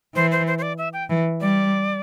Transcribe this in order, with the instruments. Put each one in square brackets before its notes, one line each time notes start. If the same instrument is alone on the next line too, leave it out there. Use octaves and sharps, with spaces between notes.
[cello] E3 [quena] C5
[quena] C5
C5
C5
D5
E5
G5
[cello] E3
[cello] G3 [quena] D5